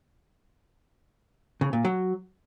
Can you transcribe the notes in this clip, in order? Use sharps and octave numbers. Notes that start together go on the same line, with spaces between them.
C#3
A#2
F#3